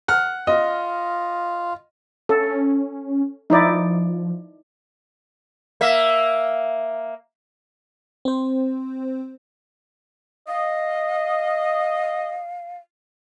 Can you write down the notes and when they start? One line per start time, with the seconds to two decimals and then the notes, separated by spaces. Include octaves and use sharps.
0.08 F#5 F6
0.47 F4 D#5
2.29 C#4 A4
3.50 F3 D#4 E4 D5
5.81 A#3 E5
8.25 C4 C5
10.48 D#5 F5